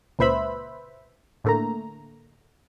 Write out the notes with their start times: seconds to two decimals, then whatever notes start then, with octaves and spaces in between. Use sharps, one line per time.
0.19 C#2 A#2 B4 C5 E5 B5
1.44 A2 D3 A3 A#3 A#5